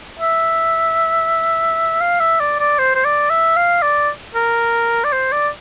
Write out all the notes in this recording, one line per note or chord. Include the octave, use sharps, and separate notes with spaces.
E5
F5
E5
D5
D5
C5
C5
D5
E5
F5
D5
A#4
D5
C5
D5